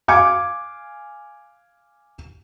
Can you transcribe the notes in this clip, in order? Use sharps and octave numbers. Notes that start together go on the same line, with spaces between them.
F5 G#5 D6 G#6 C#7